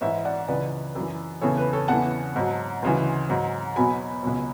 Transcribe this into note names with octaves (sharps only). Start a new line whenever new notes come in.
G#2 E3 C#5 E5
D5 F#5
C#2 C#3 E3 B4 D5
F#2 E3
E2 C#3 E3 A4 C#5
B4
A4 C#5
E2 C#3 E3 F#5 A5
G#2 F#3
D2 C#3 E3
G#2 F#3
E2 B2 F#3 G#5 B5
C#2 B2 F#3